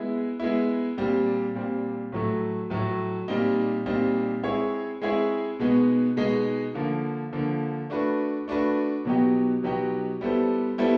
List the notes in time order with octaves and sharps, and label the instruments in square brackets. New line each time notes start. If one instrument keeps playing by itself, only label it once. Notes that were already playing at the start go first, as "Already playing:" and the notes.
Already playing: [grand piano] G#3 B3 E4
G#3 B3 E4
A#2 G3 C4
A#2 G3 C4
A2 F#3 A3
A2 F#3 A3
A#2 G3 C4 D#4
A#2 G3 C4 D#4
G#3 C4 E4 G#4 C#5
G#3 C4 E4 G#4 C#5
B2 G#3 B3 D#4
B2 G#3 B3 D#4
D3 F3 A#3
D3 F3 A#3
A3 D4 F#4 B4
A3 D4 F#4 B4
B2 F#3 B3 D#4 G4
B2 F#3 B3 D#4 G4
G3 B3 E4 A4 C5
G3 B3 E4 A4 C5